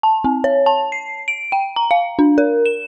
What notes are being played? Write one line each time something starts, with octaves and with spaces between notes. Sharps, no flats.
A5
C4
C#5
A5
C7
D7
G5
A#5
F5
D4
A#4
E7